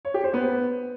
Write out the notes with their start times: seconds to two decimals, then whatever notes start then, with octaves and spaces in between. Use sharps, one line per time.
0.05 C#5
0.14 G4
0.24 C5
0.33 B3